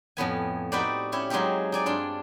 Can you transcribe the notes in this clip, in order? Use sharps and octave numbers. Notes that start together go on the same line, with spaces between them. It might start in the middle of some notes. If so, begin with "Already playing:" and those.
F2 A2 B3 G#5
D#4 F#4 G4 B4 C5 D5
C#4 E4 G4 C#5
F#3 G#3 C4 D#4 F4 G4
D#4 D5 G#5
G2 D4 F4